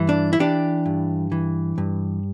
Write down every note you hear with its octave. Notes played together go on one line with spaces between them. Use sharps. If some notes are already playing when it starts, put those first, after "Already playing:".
Already playing: G2 E3
D4
E4
E3 D4 G4
G2
E3
G2